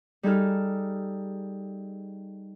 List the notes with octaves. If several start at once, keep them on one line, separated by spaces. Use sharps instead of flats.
G3 D#4 G#4 A4 F6